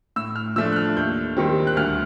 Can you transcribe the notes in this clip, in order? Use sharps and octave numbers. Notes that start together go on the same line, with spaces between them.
A2 E6
F6
F3 A3 D4 E6
F#6
F6
D#2 G6
D#3 G3 C4
F#6
D2 F6